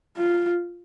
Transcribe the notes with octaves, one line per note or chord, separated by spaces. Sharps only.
F4